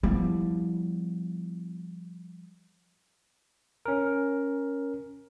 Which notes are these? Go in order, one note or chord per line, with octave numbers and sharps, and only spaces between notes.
F3 G3 B3 E4
C#4 A#4